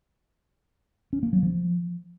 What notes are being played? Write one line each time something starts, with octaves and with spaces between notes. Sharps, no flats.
C#4
A#3
F#3
F3